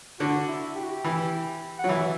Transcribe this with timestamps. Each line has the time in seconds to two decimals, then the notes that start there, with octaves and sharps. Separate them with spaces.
0.19 D3 F#4
0.48 E4
0.76 G4
0.83 F#4
0.91 G4
1.04 E3
1.79 F#3 F#5
1.89 E3 E5